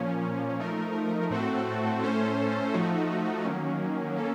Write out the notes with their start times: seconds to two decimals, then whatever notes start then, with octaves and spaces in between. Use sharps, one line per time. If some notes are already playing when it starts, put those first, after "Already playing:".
Already playing: A#2 F3 A#3 C#4
0.59 F3 A3 D#4 A#4
1.30 A2 A3 C4 F#4 A4
2.02 A2 A3 C#4 A4 C5
2.74 F3 A3 D#4 F#4
3.45 D#3 F#3 A#3 C#4
4.16 A#3 C#4 A4